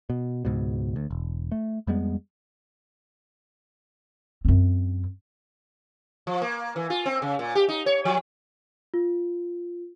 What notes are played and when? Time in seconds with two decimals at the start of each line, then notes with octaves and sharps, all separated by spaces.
0.10 B2
0.45 C#2 G#2 B2
0.96 D2
1.11 E1
1.52 A3
1.87 F2 G3 G#3 B3
4.45 F#2 C4
6.27 F3
6.42 A#3
6.76 E3
6.90 F4
7.06 C4
7.22 C#3
7.39 A#2
7.55 G4
7.69 D#4
7.86 C#5
8.05 F3
8.94 F4